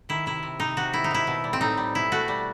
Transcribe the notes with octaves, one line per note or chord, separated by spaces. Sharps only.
D#3 E4
C3 E4
C3
C3 D#4
C3 F#4
D#3 E4
D#4
D#3 E4
B2
G3
C4
A2 D#4
G3
B2 E4
A3 F#4
G3